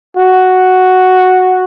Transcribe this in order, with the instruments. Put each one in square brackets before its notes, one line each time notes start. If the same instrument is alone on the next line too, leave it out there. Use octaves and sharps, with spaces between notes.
[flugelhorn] F#4